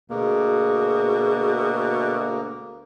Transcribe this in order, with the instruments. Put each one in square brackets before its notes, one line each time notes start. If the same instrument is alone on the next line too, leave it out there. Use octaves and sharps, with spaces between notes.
[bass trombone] D2 [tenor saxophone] B2 [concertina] A#3 [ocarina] G#4